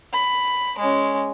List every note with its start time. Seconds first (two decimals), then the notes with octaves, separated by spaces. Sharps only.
0.14 B5
0.79 G#3 C#4